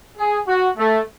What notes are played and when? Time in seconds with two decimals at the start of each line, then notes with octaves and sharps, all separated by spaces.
0.18 G#4
0.47 F#4
0.77 A3